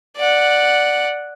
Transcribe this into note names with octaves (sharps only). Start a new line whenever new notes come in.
D5 F#5